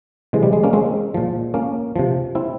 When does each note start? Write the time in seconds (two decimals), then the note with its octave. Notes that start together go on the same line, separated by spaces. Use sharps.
0.33 C3 E3 G#3
0.43 G3
0.53 G#3
0.64 A#3 C#4
0.73 G#3 C4
1.14 A#2 F3
1.54 A#3 C#4
1.96 C3 F3
2.35 C4 E4